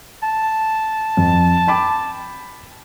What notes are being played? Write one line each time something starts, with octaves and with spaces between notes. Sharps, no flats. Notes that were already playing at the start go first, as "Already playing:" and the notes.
A5
F2
G5 B5 D6